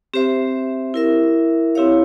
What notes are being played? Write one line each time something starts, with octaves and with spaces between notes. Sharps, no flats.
C4 G4 C5 E5
E4 A#4 E5
C4 E4 G4 C#5 F5